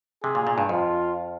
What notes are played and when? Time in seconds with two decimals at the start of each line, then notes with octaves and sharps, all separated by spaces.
0.23 C3 G#4
0.35 A#2
0.47 A#2
0.58 G2
0.69 F2 F4